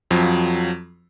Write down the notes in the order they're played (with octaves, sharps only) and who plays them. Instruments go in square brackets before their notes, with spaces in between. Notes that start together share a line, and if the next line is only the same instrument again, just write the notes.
[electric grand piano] F2 F3 F#3 C4